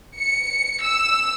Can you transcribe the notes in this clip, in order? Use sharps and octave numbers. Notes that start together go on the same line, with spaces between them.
C#7
E6